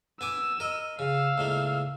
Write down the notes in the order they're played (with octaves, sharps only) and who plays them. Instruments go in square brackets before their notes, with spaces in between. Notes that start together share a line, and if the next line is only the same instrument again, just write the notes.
[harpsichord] B3 G#5 D6 [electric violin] E6
[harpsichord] A#4 D#5
[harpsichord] C#3 [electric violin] F5 E6
[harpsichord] C#2 A2 A#3